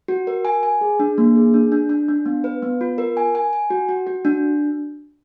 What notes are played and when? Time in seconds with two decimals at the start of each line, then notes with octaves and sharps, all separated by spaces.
0.08 F#4
0.27 A#4
0.45 G#5
0.63 G#5
0.81 G#4
1.00 D4
1.18 A#3
1.36 G#4
1.54 D4
1.72 D4
1.89 D4
2.08 D4
2.26 B3
2.44 B4
2.62 B3
2.81 F4
2.98 A#4
3.17 G#5
3.35 G#5
3.53 G#5
3.70 F#4
3.89 F#4
4.07 F#4
4.25 D4